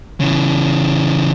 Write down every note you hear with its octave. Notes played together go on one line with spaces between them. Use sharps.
C#3 E3